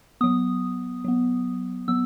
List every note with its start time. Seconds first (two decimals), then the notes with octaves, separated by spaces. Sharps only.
0.21 F#3 B3 D#6
1.04 F#3 B3
1.88 F#3 B3 E6